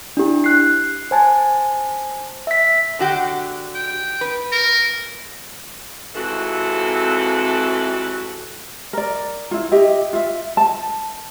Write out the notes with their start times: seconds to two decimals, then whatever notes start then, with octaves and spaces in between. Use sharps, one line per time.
0.17 D4 E4 G4
0.44 F#6 C7
1.11 C5 G#5 A5
2.47 E5 B6
2.99 D3 F#4 G4
3.75 G5
4.21 B4
4.52 A#4
6.15 F2 G#2 C3 E3 F#4 A4
8.93 A#4 D5
9.51 E4 F4
9.71 G4 D#5 E5
10.13 F4 E5
10.57 A5